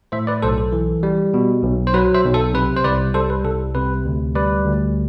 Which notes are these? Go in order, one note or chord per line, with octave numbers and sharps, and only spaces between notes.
A2 C5 E5
B4 D5
B1 A4 C5
A4
E3
G3
B2
B1
C5
F#3 B4
C5 E5
B1
A4
C3 B4
C5
C2 B4 D5
G3 A4 C5
B4
C2 A4
C3 B4
D2
G3 B4 D5
D2